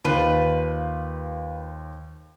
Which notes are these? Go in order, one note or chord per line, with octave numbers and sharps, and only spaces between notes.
D#2 F4 B4 C5